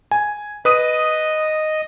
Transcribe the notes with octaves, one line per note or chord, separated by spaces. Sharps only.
G#5
B4 D#5 D#6 D#7